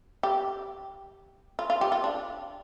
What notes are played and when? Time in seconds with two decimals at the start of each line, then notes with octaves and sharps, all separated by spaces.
0.23 G4
1.59 F4
1.70 F4
1.81 G4
1.92 F4
2.04 D4